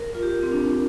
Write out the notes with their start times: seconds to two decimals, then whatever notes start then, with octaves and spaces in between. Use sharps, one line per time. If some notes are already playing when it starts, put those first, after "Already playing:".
Already playing: A#4
0.15 F4
0.23 G4
0.42 C4
0.52 D4